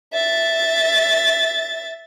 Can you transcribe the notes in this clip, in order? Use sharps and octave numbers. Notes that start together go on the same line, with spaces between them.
E5 A6